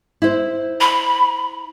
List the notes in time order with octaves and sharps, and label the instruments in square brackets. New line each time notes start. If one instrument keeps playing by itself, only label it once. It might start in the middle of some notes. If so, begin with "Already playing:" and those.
[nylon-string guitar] E4 C5
[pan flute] B5